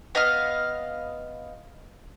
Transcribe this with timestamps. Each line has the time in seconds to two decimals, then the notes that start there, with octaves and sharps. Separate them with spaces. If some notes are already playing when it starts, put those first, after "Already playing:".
0.15 B3 D#5 F5 F6